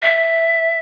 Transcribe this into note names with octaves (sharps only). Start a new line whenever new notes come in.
E5